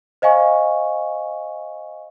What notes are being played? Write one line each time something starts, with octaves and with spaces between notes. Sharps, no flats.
C5 D#5 F5 G#5 C#6